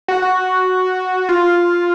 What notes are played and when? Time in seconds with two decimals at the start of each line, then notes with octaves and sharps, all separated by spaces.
0.08 F#4
0.22 F#4
1.29 F4